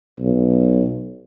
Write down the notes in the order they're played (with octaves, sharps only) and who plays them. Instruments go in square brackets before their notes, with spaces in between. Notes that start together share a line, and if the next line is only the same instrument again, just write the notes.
[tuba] B1